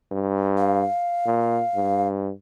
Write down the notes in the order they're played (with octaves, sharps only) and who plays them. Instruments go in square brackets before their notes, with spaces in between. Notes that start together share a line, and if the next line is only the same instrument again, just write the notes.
[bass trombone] G2
[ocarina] F5
[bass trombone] A#2
G2